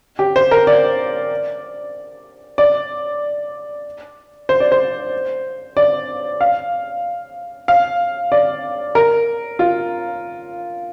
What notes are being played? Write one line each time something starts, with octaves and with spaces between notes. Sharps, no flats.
G4
C5
A#4
D5
D5
C5
D5
C5
D5
F5
F5
D5
A#4
F4